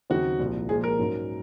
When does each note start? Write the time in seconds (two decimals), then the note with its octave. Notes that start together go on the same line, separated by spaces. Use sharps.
0.10 D#2 C#3 F#3 C4 D#4 F#4
0.39 C2 A#2 F3
0.69 A#2 F3 G#3 G#4
0.84 A#4
0.98 G#2 F#3 C#4